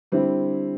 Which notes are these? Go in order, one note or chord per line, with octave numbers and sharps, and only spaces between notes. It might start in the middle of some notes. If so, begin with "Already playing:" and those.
D3 G3 C4 E4